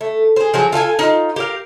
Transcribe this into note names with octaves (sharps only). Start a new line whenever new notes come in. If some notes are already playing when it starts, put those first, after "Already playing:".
A3
G#4 C5
F3 F#3 G#4
F4 A4 F#5 G#5
D#4 F4
G4 A#4 F5